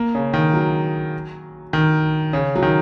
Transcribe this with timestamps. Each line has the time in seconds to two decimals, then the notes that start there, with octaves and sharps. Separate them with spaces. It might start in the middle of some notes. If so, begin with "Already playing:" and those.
Already playing: A#3
0.15 C#3
0.34 D#3
0.54 F#3
1.73 D#3
2.33 C#3
2.55 F#3
2.62 D#3